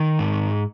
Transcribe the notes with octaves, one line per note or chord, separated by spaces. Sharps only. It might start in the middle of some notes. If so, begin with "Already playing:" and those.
Already playing: D#3
G#2